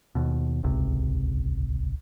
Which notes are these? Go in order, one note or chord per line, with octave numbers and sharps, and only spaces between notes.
D#2 B2
D#1 G#1 C#2 C3